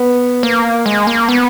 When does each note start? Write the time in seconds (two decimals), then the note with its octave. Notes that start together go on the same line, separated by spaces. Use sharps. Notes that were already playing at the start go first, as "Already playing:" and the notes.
Already playing: B3
0.43 A#3
0.86 G#3
1.07 A#3
1.29 B3